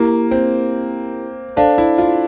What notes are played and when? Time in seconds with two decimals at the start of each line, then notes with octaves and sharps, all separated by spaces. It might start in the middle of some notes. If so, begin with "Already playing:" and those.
Already playing: A#3 E4 G4 A#4
0.31 C4
1.57 D4 A4 C5 F5 A5
1.78 E4
1.98 F4